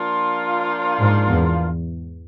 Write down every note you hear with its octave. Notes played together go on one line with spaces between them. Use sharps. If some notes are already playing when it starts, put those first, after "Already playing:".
Already playing: F3 A#3 D4 F4
G#2
E2